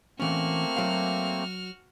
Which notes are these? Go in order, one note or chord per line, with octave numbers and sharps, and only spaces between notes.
E3 A3 A#3 C4 C#4 F#4 F6
F#3 F5